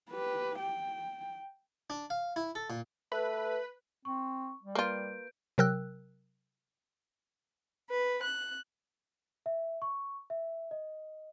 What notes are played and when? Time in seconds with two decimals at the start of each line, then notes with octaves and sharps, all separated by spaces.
0.11 G4 B4
0.59 G5
1.90 D4
2.10 F5
2.36 E4
2.55 A4
2.70 A#2
3.12 A3 B4
4.05 C4 C#6
4.63 G3
4.75 A#3 F4 B4 G6 D7
5.58 C3 F#3 A#4 G5 E6 F#6
7.89 B4
8.22 F#6
9.46 E5
9.82 C#6
10.30 E5
10.71 D#5